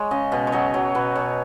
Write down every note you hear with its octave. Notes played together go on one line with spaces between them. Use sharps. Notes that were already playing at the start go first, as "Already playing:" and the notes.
Already playing: G#3 C#5
C#3 D#5
B2 D#5
C#5
F#3 D#5
F#3 C#5
B2 B4
B2 C#5